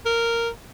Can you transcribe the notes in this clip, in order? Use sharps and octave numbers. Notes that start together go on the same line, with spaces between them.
A#4